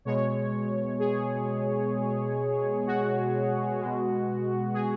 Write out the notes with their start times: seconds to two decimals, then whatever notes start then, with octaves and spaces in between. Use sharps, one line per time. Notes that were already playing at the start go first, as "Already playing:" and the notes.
0.05 B2 G#3 C#5
0.99 G#4
2.87 F#4
3.80 B2 G#3
4.73 G#4